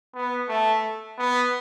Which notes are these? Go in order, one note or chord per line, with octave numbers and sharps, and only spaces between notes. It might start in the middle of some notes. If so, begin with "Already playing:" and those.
B3
A3
B3